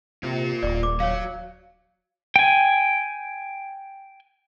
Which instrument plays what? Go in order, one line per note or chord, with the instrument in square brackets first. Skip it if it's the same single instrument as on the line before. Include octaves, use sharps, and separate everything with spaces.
[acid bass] C3 [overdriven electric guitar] A#3 F4
[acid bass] D#1 [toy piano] D5
[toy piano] D6
[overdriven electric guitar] F#3 [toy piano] C#5 F5
[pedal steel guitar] G5 G#5